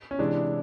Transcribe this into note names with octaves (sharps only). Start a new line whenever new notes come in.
C#4
C3 E3 G#3 D4